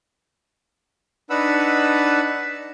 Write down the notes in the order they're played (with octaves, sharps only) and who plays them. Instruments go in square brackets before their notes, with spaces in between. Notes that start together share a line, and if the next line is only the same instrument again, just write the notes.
[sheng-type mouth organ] D4 D#4 B4 F#5 B5 E6